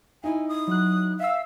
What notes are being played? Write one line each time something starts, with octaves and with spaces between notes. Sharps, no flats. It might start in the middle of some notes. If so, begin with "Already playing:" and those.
D#4 E4 G#5
D#6
F#3 F#6
E5 F5 E6